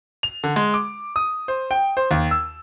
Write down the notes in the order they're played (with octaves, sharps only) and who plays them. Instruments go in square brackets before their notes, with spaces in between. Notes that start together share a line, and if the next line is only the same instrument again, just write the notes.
[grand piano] F7
D3
G#3
D6
D#6
C5
G5
C5
D#2
E6